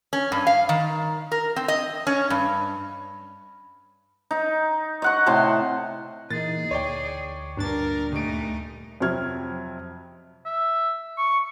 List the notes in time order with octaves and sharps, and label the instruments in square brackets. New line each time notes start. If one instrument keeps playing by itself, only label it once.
[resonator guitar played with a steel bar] C#4
G2
F5
D#3
A#4
C4
D#5
C#4
G2
[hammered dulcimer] D#4
D#5 F#5 C#6
A2 C3 A5 C6
[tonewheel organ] A#2 E3 A#3 [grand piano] D#4 A6 [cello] G#4
[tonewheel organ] D2 [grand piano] C#5 D5 G5
[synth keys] G2 D4 A6 [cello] A#2 A#4
[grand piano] D#1 D7 [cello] A3 D#4
[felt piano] F2 C3 F#3 F6 G#6
[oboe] E5
C#6